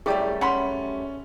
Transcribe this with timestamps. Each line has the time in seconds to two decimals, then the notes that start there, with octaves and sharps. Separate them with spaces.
0.06 F#2 G3 A3 E4 G4 G#4 D5
0.41 C#4 F#5 B5 C6